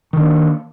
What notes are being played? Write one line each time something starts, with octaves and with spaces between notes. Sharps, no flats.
D#3 A#3 D4